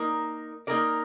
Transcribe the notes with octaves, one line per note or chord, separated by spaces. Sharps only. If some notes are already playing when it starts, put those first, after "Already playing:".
Already playing: A#3 D#4 A#4 D5
A#3 D#4 A#4 D5